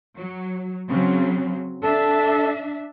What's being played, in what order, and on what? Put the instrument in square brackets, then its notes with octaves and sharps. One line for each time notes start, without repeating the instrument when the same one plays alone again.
[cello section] F#3
C#3 F#3 C4
[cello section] D4 E5 [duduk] A4